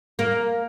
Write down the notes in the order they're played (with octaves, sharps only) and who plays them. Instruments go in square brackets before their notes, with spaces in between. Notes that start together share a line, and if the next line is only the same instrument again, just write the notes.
[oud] A#3